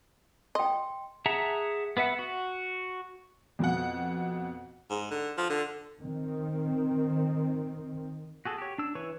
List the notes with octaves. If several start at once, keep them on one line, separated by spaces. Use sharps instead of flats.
D#5 G5 C6
G#4 E5 F#5 A5 A#5
B3 B4 E5 F#5
F#4
F2 B2 F#5
G#2
D3
F3
D3
D#3 C4
F#4 G#4 A4
G4 C#5
D4 E6
E3 B4 C#5 C#6